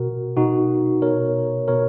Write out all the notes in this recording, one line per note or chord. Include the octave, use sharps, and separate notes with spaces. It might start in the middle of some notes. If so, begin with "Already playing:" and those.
Already playing: B2 F#4 A#4
B2 D#4 F#4
B2 A#4 C#5
B2 A#4 C#5